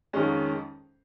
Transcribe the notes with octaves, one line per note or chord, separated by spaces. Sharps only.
F2 D#3 G#3 C#4